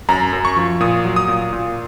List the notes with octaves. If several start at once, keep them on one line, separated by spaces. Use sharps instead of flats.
F#2 A#5
F#2
C#6
F3
A#2 D#6
F#3
D#6
A#2
A#2